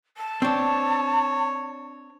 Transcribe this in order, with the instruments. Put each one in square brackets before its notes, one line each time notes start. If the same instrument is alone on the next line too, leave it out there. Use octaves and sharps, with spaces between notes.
[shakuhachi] A5
[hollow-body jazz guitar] C4 D4 [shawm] C#5